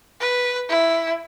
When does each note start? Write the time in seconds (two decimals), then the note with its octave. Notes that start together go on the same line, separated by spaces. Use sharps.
0.20 B4
0.69 E4